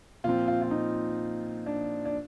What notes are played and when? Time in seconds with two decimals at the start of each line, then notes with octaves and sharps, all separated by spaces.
0.24 A#2 F3 C4 F4
0.48 F4
0.62 F4
0.71 D#4
1.66 D4
2.05 D4